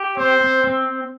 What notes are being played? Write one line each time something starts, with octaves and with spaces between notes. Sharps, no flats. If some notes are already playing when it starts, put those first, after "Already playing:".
Already playing: G4
C4 C5
C4
C4